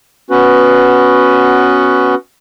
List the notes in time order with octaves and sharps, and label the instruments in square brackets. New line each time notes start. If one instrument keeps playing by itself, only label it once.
[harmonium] B3 C#4 F#4 B4